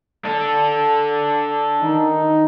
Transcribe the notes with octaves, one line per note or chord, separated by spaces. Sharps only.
D4 A4
D#3 D#4